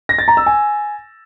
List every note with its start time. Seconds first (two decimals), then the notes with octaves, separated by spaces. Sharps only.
0.09 A#6
0.19 A6
0.28 A#5
0.37 E6
0.46 G#5